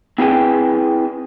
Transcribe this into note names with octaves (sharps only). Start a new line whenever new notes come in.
C4 E4 G#4 B4 G5 G#5